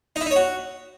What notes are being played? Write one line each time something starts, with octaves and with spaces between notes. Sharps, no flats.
D#4
E4
D#4
C#5
F#4